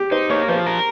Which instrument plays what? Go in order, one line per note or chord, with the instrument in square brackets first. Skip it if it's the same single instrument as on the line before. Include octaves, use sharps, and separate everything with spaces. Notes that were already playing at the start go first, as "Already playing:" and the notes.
Already playing: [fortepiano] G4
[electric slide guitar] D#4 [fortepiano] C5
[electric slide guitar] A#3 [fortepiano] C#5
[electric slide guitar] F3 [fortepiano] C5
[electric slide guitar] A#4